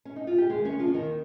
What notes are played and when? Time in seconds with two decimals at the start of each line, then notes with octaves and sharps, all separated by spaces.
0.05 C#4
0.16 D#4
0.27 F4
0.38 G4
0.50 D#2 G#3 G#4
0.65 C#4 C#5
0.72 C#3 G#3
0.79 F3 F4
0.88 C#4
0.93 D#2 D#3 D#4